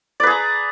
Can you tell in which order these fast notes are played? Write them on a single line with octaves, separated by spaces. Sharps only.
D5 B4 G#4 A#5